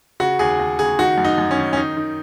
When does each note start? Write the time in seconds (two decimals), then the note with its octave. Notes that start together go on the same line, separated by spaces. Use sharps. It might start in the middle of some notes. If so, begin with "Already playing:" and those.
0.20 C#3 F#4
0.39 D#2 G#4
0.59 D#2
0.79 C#3 G#4
0.99 D#3 F#4
1.18 F#2
1.25 D#4
1.38 F#2
1.51 C#4
1.57 D#3
1.73 C#4
1.77 D#3 D#4
1.97 D#3